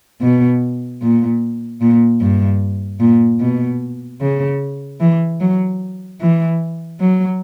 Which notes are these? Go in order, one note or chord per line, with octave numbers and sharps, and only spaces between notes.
B2
A#2
A#2
G2
A#2
B2
C#3
E3
F#3
E3
F#3